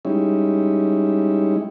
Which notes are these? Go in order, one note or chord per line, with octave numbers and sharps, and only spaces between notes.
G3 G#3 C#4 D#4 E4